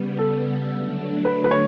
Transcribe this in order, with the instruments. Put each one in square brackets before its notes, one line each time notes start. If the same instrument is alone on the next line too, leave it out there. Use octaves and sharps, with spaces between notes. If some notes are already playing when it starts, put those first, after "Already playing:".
Already playing: [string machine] C#3 G3 B3
[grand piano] A4
[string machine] D3 F#3 A3 D4
[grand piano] B4
B4
C#5